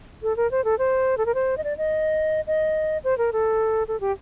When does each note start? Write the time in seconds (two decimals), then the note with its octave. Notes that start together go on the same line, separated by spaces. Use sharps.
0.23 A4
0.37 A#4
0.51 C5
0.65 A4
0.79 C5
1.18 A4
1.26 A#4
1.35 C5
1.58 D#5
1.64 D5
1.78 D#5
2.47 D#5
3.04 C5
3.18 A#4
3.33 A4
3.88 A4
4.01 G4